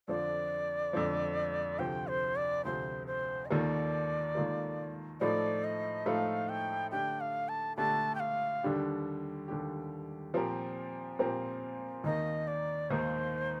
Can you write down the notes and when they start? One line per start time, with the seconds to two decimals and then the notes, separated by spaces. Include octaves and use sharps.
0.08 F2 D3 F3 D5
0.93 F2 D3 F3
1.79 D2 C3 F3 G5
2.07 C5
2.36 D5
2.65 D2 C3 F3 C5
3.07 C5
3.46 D#5
3.50 D#2 D#3 A#3 F4 A4 D5
4.35 D#2 D#3 A#3 F4 A4
5.20 A2 F3 A3 D#4 A4 D5
5.64 D#5
6.06 A2 F3 A3 D#4 A4 F5
6.49 G5
6.91 D3 A3 D4 G4 G5
7.20 F5
7.49 A5
7.77 D3 A3 D4 G4 A5
8.15 G5
8.20 F5
8.63 D#2 D3 G3 D4 G4
9.48 D#2 D3 G3 D4 G4
10.34 A#2 F3 C4 G4 A#4
11.19 A#2 F3 C4 G4 A#4
12.04 D#2 D#3 A#3 D#4 A#4 D#5
12.47 D5
12.90 D#2 D#3 A#3 D#4 A#4 C5